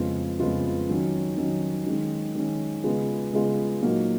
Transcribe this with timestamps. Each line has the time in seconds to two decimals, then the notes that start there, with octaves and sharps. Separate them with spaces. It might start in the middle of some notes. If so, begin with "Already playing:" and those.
Already playing: F2 C#3 G#3 B3 F4
0.40 F2 C#3 G#3 B3 F4
0.89 D#3 F#3 C#4
1.37 D#3 F#3 C#4
1.87 D#3 G#3 C#4
2.35 D#3 G#3 C#4
2.84 C#3 G#3 B3 F4 G#4
3.32 C#3 G#3 B3 F4 G#4
3.81 A#2 F#3 A#3 D#4 F#4